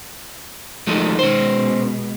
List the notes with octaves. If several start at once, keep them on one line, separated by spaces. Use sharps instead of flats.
D#3 F3 G#3 A3
B2 G#3 C#4 C5